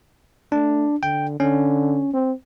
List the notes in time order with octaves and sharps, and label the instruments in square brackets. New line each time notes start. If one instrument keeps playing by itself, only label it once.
[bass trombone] A3 [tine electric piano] D4
[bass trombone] D3 [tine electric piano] G5
[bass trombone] D3 [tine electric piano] C#4
[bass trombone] C4